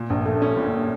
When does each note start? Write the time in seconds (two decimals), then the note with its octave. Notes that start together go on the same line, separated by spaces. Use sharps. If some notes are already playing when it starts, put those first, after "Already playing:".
Already playing: A#2
0.10 A#1
0.26 A3
0.42 C#4
0.57 A#2